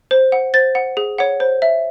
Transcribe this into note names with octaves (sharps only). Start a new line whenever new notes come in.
C5
F#5
C5 A6
F#5
G#4
C#5 F#5
C5
E5